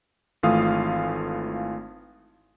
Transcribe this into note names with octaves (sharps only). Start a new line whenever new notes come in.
G#1 E3 A3 F4 F5 D#6